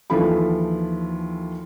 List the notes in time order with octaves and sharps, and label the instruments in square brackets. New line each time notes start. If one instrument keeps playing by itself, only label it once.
[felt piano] D#2 E3 F3 F4 A4 B5